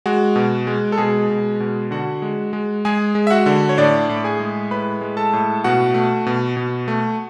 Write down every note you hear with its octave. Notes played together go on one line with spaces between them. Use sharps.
G#3 F#4
B2
G#3
A4
B2 G#3 G#4
B2
B2
D3 F#4 F#5
G#3
G#3
G#3 G#4 G#5
G#3
E5
F#4 F#5
D3
C#5
A2 D4 D5
A2
G#4 G#5
G#3
A2 B4 B5
G#3
A4 A5
A2
B2 F#4 F#5
A3
B2
B2
A3